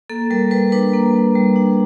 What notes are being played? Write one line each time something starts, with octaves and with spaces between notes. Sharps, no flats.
A#3 A4
G3 A#4
G3 B4
D4 B4
A#3
G3
G3
D4